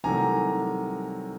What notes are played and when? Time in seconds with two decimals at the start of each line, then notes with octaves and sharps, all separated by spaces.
0.04 C2 C3 D#3 F#3 A3 G#5 A#5